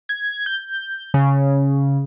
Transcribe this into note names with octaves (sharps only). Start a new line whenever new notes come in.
G#6
G6
C#3